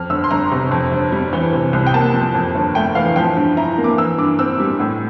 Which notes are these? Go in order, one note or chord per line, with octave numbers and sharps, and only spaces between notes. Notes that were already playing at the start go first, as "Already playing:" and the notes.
Already playing: F2 F6
G1 E6
C6
G1 A#5
C3
F2
G1
G3
E3
C3
C2
G5
A#3 A5
F3
F2
G1
A3 G5
E3 F5
F3 G5
G2
E4 A#5
A#3
D6
E3 E6
G2 D6
C4 E6
G3
A2